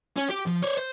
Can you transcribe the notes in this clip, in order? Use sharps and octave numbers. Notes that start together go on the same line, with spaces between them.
C#4
G4
F3
C5 C#5
C5